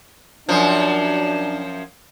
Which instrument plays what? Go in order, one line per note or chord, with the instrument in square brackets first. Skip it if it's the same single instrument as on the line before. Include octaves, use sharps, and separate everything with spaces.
[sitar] F#2 F3 [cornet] D4